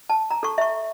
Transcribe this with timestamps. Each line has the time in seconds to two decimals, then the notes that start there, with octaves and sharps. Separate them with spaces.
0.10 A5
0.31 A#5
0.43 A4 C#6
0.58 E5 C#6